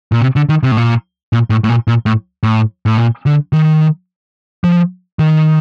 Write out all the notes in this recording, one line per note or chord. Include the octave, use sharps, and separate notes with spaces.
A#2
C3
D3
D#3
C3
A2
A#2
A#2
A2
A2
A#2
A#2
A2
A2
A2
A#2
D3
D#3
F3
D#3